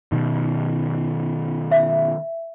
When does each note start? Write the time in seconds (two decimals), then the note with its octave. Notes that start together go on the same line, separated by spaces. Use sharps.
0.12 B2 D#3
1.71 E5